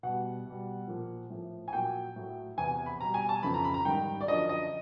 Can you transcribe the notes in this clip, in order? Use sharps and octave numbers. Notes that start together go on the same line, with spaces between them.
B2 G3 F#5
B2 G3
A#2 F3
A2 F3
G#5
A#2 F#3 G5
A2 F#3
E2 C3 E3 G#5
B5
B2 G3 A#5
G#5
A5
F2 C#3 E3 B5
A#5
B5
A#5
G#2 D#3 G3 G5
D5
F#2 D3 F3 D#5
D#5